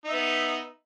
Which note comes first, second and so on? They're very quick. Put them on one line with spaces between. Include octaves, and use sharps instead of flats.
D#4 E5 B3